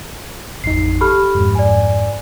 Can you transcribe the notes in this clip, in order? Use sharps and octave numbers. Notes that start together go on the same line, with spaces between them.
A1 F2 D#4 C7
G4 A4 B5 F6
F2 G#2
D5 G#5